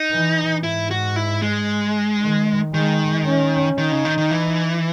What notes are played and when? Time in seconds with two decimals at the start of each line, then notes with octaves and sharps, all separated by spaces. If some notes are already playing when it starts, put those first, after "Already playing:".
Already playing: D#4
0.11 E3
0.63 G#2 E4
0.91 F#4
1.16 E4
1.42 G#3
2.21 D#3
2.74 D#3 G#3
3.26 C#4
3.78 D#3 D#4
3.92 C#3
4.05 D#3
4.18 D#3
4.31 E3